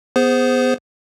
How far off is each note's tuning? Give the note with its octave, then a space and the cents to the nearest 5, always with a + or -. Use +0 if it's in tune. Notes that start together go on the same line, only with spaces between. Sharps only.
B3 +0 G#4 +0 C5 -15